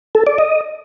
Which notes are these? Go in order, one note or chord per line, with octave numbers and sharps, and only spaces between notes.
A4
D5
D#5